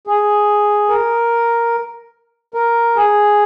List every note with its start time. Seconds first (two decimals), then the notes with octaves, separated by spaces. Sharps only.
0.07 G#4
0.90 A#4
2.54 A#4
2.96 G#4